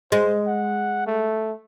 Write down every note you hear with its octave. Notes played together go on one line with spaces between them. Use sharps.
G#3 C5
F#5
A3